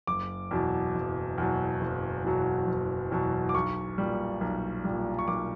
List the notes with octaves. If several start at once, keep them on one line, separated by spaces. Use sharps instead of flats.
F#1 D6
E2 B2 F#3
F#1
E2 B2 F#3
F#1
E2 B2 F#3
F#1
E2 B2 F#3
D6
B1 C#6
A#2 G3
B1
A#2 G3
C#6
B1 D6